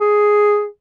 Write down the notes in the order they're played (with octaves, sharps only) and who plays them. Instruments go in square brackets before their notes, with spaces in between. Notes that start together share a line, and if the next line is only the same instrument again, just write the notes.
[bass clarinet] G#4